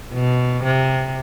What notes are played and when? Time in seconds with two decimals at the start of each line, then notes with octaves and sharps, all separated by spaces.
0.13 B2
0.64 C3